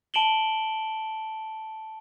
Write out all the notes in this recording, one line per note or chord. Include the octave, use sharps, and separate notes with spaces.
A5 D7 E7 F#7 G7